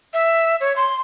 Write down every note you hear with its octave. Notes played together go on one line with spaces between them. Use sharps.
E5
C#5
C6